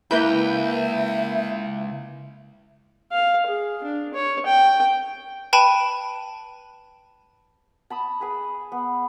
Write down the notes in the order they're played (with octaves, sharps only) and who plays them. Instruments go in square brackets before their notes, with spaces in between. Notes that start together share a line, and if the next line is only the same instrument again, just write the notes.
[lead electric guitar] C#2 [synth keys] A#3 B4 G6 [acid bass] E4 [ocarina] E5
[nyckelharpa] F5
G#4
D4
C#5
G5
[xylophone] B4 G5 A5 B5 D#7
[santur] A5 B5 D#6
G#4 B4 G#5
B3